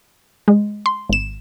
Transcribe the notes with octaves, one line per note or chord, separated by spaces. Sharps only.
G#3
C6
G#1 E7